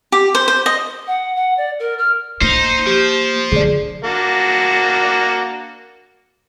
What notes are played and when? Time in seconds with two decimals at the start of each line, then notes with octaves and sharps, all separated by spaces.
0.12 G4
0.35 C5
0.48 C5
0.66 D#5
1.07 F#5
1.36 F#5
1.58 D5
1.80 A#4
1.98 F6
2.41 A#3 D#4 C5
2.87 F3 G4 G6
3.52 D3 G#4 D5
4.04 A#3 D4 F#4